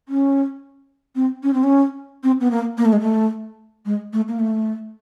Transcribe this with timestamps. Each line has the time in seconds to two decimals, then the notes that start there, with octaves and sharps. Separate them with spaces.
0.08 C#4
1.15 C4
1.43 C#4
1.53 C4
1.63 C#4
2.23 C4
2.40 B3
2.51 A#3
2.78 A#3
2.85 A3
2.92 G#3
3.00 A3
3.85 G#3
4.13 A3
4.28 A#3
4.39 A3